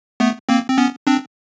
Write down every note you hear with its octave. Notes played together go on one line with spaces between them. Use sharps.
A3 B3
A#3 C4
C4
B3 C#4
C4 D4